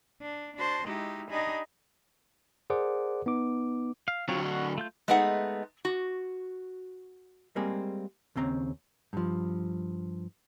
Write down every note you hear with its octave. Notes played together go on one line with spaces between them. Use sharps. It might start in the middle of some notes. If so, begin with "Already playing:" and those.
D4
D4 F#4 C5 A5 C6
G#3 D#4 E4 F#4 G4
D4 D#4 G4 D#5 G#5 B5
G#4 A#4 C5 D5 F#5 D6
B3 D#4 D6
F5
D2 F#3 C4 F4 C#5
F#4
A3 F4 G6
G#3 A3 B3 D#4 G#4 F#5
F#4
G3 G#3 A#3 C4 G#4
D#2 C#3 C4 A#5
G2 F3